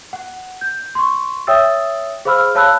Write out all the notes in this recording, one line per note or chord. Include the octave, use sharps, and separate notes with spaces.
F#5
G6
C6 C#6
C#5 E5 G5 D#6 E6 A6
G#4 C5 F5 B5 E6 F6
C#5 F5 A5 B5 E6 F#6